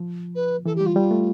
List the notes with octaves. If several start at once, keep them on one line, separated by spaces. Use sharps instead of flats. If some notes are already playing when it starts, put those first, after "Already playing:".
Already playing: F3
B4
E3 A4
G4
G3
F4
G3
A3